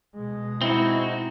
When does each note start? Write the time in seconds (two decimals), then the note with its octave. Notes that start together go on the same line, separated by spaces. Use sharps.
0.15 B2 G#3
0.62 C4 D#4 E4 F#4